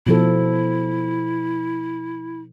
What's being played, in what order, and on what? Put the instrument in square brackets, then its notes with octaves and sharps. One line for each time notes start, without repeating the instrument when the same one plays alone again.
[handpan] B2 F3 A4 [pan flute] E4